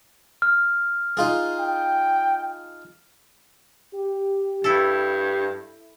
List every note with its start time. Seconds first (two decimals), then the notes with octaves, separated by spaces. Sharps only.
0.42 F6
1.17 D#4 F4 G#4
1.59 G5
3.95 G4
4.64 G2 E4 A4